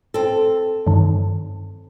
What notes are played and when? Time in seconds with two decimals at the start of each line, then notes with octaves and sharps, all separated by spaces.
0.14 C4 A4
0.87 G2 D#3